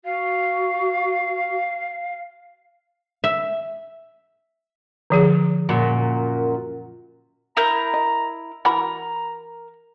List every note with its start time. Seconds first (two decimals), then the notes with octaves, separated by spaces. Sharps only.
0.05 F#4 F5
3.24 E5
5.10 D3 F3 G#4
5.69 F#2 A#2
7.57 E4 A#4 A#5 G6
7.94 D#5
8.65 E3 F#4 A#4 A#5 B5